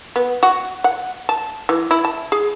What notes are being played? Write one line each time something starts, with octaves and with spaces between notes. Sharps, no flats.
B3
F#4
F#5
A5
E3
E4
A5
G#4